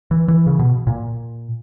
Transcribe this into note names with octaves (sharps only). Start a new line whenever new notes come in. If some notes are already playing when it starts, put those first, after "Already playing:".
E3
E3
C#3
B2
A#2